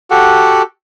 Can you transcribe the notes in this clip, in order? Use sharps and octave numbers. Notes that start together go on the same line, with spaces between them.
F#4 G4 A4 F#5